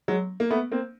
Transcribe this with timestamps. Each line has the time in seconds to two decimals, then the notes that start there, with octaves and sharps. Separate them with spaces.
0.08 F#3 G#3
0.40 A#3
0.50 A3 B3
0.72 A#3 C4